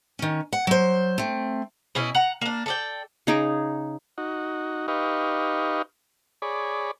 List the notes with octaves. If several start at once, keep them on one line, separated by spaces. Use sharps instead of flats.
D#3 C#4
F#5
F#3 C5
A3 C4
B2 C#4 E4
F#5 A#5
A#3 D4
A4 D5 G5
C#3 D#4 G#4 D6
D#4 F#4
D#4 G4 B4 D#5 F5 C#6
G#4 C#5 D5 B5